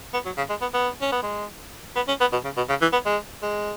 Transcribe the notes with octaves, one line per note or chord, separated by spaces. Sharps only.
B3
F#3
C#3
G#3
B3
B3
C#4
B3
G#3
B3
C#4
B3
B2
C#3
B2
C#3
E3
B3
G#3
G#3